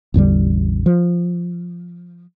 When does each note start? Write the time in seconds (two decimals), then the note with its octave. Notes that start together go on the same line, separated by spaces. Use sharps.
0.14 A1 E2 D3 G3
0.86 F3